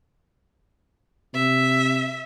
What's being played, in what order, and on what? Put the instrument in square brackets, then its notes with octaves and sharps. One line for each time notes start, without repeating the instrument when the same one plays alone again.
[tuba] C3 [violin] E5